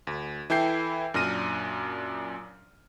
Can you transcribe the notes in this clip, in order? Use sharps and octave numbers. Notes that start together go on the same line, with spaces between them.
D2
E3 E4 A4 G5 G6 C7
F#2 A#2 D4 F6 A#6 D#7